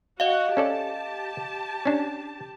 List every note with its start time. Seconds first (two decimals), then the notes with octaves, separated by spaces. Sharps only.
0.20 F#4 D#5 F5 F#5
0.57 C#4 G4 A4 D5 A5
1.85 C#4 D4